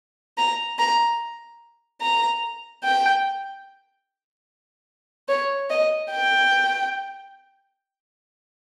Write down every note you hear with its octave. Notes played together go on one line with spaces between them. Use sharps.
A#5
A#5
A#5
G5
C#5
D#5
G5